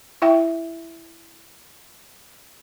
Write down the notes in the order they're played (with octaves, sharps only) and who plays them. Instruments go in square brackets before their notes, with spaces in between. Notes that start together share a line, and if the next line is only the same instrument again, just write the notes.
[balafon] E4 E5 G5